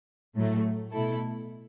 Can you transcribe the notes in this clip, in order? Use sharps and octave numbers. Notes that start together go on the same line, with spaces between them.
A2 F#3 A3
B2 A3 E4 A4